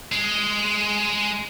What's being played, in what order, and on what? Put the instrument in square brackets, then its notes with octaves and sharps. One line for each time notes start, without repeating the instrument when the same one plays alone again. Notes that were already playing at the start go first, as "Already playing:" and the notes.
[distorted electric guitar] G#3